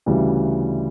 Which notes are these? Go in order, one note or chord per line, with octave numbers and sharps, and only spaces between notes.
D2 C#3 E3 G3